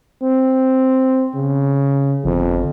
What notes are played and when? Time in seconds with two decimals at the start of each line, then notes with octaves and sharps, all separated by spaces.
0.23 C4
1.35 C#3
2.25 G1 F2